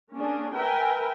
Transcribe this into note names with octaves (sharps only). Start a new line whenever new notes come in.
A#3 C#4 D4 G#4
A#4 B4 E5 G5 G#5